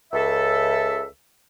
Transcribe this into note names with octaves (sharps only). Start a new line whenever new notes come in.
C#2 A4 E5